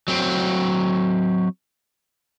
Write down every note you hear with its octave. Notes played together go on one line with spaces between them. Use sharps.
F#3 C4